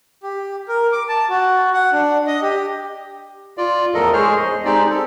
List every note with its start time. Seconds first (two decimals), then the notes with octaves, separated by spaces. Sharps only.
0.23 G4
0.68 A#4
0.92 D6
1.09 A5
1.29 F#4
1.74 F#5
1.92 D4
2.27 D#5
2.42 G4
3.58 F4 D5
3.94 E2 A2 F3 A4 A#4 D#5
4.13 G#3 G#4 C5 C#5 F6
4.37 D#5
4.65 G#3 C4 D#4 G4 D5
4.90 A4